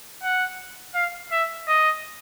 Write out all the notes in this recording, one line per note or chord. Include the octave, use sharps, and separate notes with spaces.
F#5
F5
E5
D#5